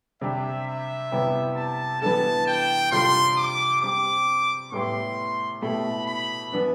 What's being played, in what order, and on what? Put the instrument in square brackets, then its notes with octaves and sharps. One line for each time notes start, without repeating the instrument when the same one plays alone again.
[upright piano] C3 G3 D4 G4 [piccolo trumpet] E5
[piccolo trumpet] E5
[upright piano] C3 G3 B3 E4 G4
[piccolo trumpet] A5
[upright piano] E3 G3 B3 D4 A4 [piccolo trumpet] A5
[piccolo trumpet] G5
[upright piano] C3 G3 D4 F4 A4 [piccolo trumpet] C6
[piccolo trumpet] D6
[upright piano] G3 C4 G4 [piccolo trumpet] D6
[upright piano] A2 G3 B3 E4 G4 [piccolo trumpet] C6
[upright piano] B2 A3 E4 G4 [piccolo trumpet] B5
[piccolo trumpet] B5
[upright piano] E3 B3 D4